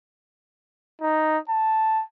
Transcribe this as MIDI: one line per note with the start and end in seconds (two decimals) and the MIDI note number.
1.01 1.38 63
1.49 2.03 81